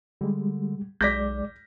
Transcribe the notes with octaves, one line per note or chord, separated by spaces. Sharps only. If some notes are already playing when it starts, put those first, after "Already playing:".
D3 G3 G#3
B1 G#3 D5 G6 A#6 B6